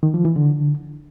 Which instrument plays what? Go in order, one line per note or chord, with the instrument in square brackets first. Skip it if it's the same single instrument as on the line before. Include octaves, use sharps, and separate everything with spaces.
[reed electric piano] D#3
F3
E3
D3